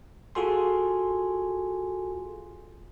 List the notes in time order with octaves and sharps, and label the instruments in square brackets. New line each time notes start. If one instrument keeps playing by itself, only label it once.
[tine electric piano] F4 F#4 G#4 A4 G#5 C6